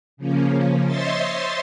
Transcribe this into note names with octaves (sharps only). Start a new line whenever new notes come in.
C#3 F3 A#3 C#4
C5 C#5 D#5 E5 C6 A6